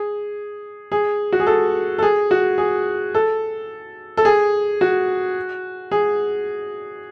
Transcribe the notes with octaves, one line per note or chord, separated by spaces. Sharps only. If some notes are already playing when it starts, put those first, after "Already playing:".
Already playing: G#4
G#4
F#4
G#4
A4
A4
G#4
F#4
G#4
A4
A4
G#4
F#4
G#4